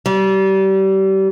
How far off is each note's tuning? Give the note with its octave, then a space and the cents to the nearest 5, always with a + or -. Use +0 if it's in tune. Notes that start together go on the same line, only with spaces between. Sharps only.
G3 -30